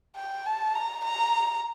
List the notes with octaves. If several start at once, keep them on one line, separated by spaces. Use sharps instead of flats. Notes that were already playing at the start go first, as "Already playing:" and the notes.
G5
A5
A#5
A#5